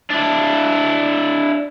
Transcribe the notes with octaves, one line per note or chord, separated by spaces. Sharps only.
D4 E4